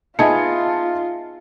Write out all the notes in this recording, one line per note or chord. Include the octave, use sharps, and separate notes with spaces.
B3 D#4 F4 G#4 E5 A5 C#7